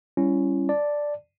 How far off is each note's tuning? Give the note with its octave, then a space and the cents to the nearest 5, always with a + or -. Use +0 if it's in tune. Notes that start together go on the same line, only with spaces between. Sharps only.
G3 +0 C#4 +0 E4 +35
D5 +0 A5 +0